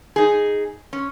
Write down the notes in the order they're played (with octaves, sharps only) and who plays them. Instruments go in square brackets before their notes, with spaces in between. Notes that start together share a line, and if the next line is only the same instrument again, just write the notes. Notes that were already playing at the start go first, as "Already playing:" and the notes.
[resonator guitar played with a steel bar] D#4 G#4
C#4